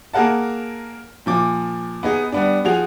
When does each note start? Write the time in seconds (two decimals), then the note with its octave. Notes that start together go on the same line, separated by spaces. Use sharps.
0.13 A#3 G#4 A#4 F#5 A5
1.26 A#2 F3 D6
2.03 B3 D#4 G#4
2.32 G3 B3 D4
2.65 F3 F#4 G#4 F7